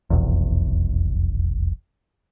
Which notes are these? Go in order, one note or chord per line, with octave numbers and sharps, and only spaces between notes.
F1 B1 E2